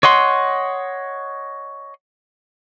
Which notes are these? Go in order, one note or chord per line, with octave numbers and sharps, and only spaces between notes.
C#5 D#5 F#5 C6